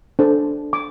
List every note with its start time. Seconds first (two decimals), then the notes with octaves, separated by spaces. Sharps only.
0.19 D4 A4 C5
0.73 D6